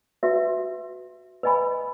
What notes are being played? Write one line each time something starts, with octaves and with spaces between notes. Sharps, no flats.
F#4 B4 E5
B4 D#5 G#5 B5